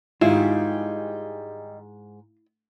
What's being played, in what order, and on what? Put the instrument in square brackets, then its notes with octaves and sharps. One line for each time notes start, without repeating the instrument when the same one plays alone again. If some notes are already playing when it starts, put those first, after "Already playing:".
[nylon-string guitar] G#2 [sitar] D#3 G3 G#4 [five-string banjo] E4 [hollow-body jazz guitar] F4